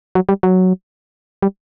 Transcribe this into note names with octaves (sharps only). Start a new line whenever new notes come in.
F#3
G3
F#3
G3